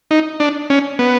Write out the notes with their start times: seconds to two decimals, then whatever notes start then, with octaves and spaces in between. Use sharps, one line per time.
0.11 D#4
0.40 D4
0.70 C#4
0.99 B3